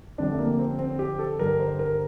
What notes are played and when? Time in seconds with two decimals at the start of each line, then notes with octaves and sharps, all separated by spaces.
0.18 F2 D3 G3 D4
0.32 A3
0.39 A#3
0.59 C4
0.79 C4
0.99 G4
1.19 A4
1.39 G2 D3 G3 A#4
1.60 C5
1.79 A#4